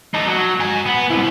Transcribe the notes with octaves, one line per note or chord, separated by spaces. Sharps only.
D#4 A4
F#3
G#5 A#5
B3
C4 E4